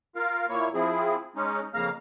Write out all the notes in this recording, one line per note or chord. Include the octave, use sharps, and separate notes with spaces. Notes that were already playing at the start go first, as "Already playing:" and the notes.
F4 A#4 F5
A#2 A#3 E4 C#5 C#6
F3 C4 E4 G#4
G#3 C#4 D#4
F2 C#3 A#3 F5 A#5 F6